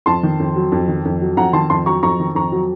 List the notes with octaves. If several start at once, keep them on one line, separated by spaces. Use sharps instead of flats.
F2 A5 C6
D#3
F2
F#3
F2
D#3
F2
F#3
F2 F#5 A#5
D#3 A5 C6
F2 A5 C6
F#3 A#5 C#6
F2 A#5 C#6
D#3
F2 A#5 C#6
F#3